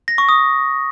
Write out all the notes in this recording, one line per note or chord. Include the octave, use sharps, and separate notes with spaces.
A#6
C#6
D#6